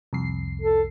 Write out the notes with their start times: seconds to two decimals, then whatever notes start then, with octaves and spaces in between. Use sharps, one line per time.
0.13 C2 F2 C7
0.61 A4